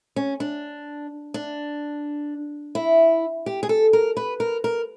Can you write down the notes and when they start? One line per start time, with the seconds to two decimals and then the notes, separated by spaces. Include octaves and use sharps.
0.16 C#4
0.40 D4
1.34 D4
2.75 E4
3.46 G4
3.63 G#4
3.69 A4
3.93 A#4
4.17 B4
4.40 A#4
4.64 A#4